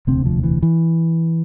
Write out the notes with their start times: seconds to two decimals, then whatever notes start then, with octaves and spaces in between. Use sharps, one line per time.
0.07 E1 D2 C3 C4
0.26 F3
0.44 E3
0.63 E3